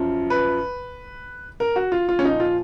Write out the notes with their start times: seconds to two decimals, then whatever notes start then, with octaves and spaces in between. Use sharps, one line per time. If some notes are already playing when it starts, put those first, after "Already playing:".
Already playing: F#2 F3
0.30 B4
1.60 A#4
1.76 F#4
1.92 F4
2.09 F4
2.19 C#4
2.24 A#2 F3 D#4
2.40 F4